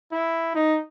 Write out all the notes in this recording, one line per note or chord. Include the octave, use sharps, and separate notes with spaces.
E4
D#4